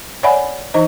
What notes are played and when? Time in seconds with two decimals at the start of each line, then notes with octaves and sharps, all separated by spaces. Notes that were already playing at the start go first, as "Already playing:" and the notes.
0.23 C#5 D5 E5 F#5 G#5 B5
0.74 E3 D#4 C5 D#5